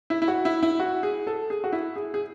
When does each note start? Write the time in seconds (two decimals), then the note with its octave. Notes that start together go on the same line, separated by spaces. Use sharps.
0.10 E4
0.22 E4
0.28 F#4
0.45 E4
0.63 E4
0.80 F#4
1.03 G#4
1.27 A4
1.50 G#4
1.64 F#4
1.72 E4
1.96 G#4
2.14 G#4